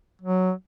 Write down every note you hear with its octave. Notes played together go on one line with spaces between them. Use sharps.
F#3